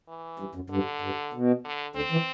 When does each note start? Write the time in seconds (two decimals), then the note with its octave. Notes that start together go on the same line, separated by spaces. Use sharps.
0.08 E3
0.39 G2
0.55 F#2
0.70 G2 D3
1.01 G2
1.33 B2
1.64 D3
1.95 D2 D3 C4
2.12 E3